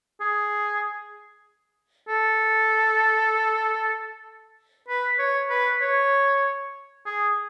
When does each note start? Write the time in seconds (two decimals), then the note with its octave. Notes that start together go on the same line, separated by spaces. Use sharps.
0.21 G#4
2.08 A4
4.88 B4
5.19 C#5
5.50 B4
5.82 C#5
7.06 G#4